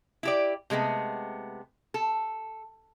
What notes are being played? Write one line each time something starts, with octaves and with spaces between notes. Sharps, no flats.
E4 G4 D5
C3 G#3 A3 B3
A4